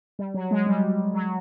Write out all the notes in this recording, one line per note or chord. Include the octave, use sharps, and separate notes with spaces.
G3
F#3
G#3
G3
F#3